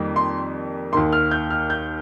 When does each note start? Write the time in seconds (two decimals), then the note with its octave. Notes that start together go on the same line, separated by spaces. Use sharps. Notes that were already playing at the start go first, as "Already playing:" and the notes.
Already playing: F2 D#3 G3 A#3
0.16 C6
0.92 D#2 D#3 A#3 C6
1.13 F6
1.31 G6
1.50 F6
1.70 G6